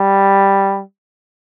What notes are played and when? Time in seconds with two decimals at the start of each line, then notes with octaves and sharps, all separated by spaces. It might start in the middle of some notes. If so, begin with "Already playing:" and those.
Already playing: G3